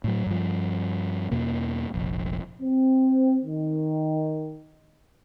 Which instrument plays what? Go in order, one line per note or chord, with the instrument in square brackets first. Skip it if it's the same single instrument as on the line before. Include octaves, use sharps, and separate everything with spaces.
[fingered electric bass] A2 F#3
G2 F3
E2 B2 A#3
F1 A#1
[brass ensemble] C4
D#3